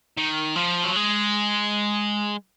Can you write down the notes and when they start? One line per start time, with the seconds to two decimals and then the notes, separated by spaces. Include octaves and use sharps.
0.17 D#3
0.56 F3
0.84 F#3
0.96 G#3